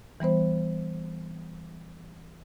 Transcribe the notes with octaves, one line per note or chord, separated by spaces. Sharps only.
E3 G3 B3 C5